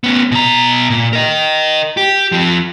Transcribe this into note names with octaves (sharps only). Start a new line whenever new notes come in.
B3 C#4
B2 A#5
A#2
A#4 D#5
G4
F3 C4